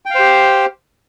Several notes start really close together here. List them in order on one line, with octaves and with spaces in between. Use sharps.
G5 F5 C5 G4